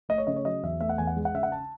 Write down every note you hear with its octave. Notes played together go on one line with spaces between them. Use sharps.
A3 D#5
C#5
C#3 D#5
C#5
F#3 D#5
E2 E5
A3 E5
F#5
E2 G#5
F#5
G#3
F#5
C#3 E5
F#5
A5